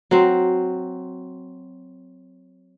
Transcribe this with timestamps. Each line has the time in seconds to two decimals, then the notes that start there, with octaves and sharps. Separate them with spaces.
0.11 F#3 C4